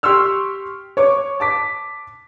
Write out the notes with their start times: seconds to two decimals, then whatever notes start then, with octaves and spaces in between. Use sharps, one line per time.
0.03 G4 C6 C#6 E6 F6
0.97 C#5 C#6 D6
1.40 A5 D6 B6